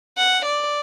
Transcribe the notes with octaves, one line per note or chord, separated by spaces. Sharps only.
F#5
D5